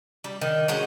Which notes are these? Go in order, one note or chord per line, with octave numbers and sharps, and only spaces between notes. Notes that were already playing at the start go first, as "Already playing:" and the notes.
G3
D#3
G#3 C#4 D#4 F#4